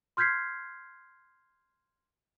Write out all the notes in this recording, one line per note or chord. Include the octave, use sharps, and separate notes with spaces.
C6 F6 G6 G#6 B6 C7